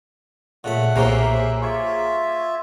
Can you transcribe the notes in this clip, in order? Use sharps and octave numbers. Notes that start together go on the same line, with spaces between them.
A#2 C#3 A3 F#5 B5
B1 A#2 A#3 C#4 G4 G#4 A#4 C5
E5
F4 E5 C#6 D6 G#6